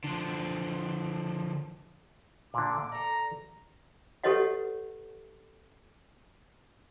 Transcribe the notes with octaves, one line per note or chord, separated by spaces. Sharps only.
D3 F3
A#2 D3 D6
A4 D5 A#5
G4 A4 B4 C#5 D#5 F#5